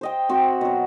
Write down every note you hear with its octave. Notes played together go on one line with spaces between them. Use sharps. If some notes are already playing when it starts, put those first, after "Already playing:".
C5 D#5 G5
C4 F#4
B2 F#3